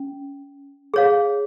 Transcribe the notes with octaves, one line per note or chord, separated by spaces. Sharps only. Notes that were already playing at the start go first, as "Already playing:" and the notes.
Already playing: C#4
G#4 C#5 F5